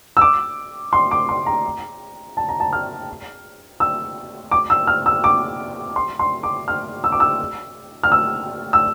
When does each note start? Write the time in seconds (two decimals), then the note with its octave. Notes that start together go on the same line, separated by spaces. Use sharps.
0.17 E6
0.21 D6
0.93 C6
1.11 D6
1.29 C6
1.46 A#5
2.37 A5
2.49 A#5
2.60 A5
2.73 F6
3.80 E6
4.51 D6
4.70 E6
4.87 F6
5.06 E6
5.24 D6
5.96 C6
6.19 C6
6.43 D6
6.68 F6
7.04 E6
7.12 D6
7.20 E6
8.03 F6
8.12 E6
8.73 E6